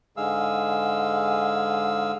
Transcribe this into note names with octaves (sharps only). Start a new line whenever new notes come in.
G#2 D3 G#3 G#4 F5 E6